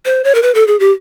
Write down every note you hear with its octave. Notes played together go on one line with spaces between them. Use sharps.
C5
C#5
A#4
B4
A4
G#4
G4